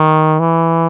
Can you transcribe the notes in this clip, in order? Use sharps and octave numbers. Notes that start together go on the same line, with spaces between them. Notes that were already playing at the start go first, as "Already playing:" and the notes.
Already playing: D#3
E3